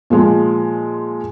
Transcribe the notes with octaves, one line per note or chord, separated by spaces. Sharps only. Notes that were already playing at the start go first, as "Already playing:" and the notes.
A#2 F3 G#3